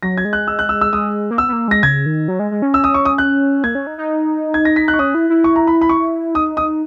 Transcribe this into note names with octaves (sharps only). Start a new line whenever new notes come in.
F#3 A#6
G#6
G#3
F#6
E6
F#6
E6
E6
G#3 D#6
A#3
B3 E6
B3
A#3
G#3 A#6
C#3 G#6
D#3
F#3
G#3
G#3
C#4
E6
D#6
C#6
D#6
F#6
A#3 G#6
C#4
D#4
D#4
G#6
A#6
B6
F#6
C#6
C#4 D#6
E4
E4
C#6
A#5
B5
B5
C#6
D#4 D#6
D#6